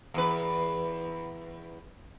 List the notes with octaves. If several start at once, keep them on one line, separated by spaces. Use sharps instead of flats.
E2 B4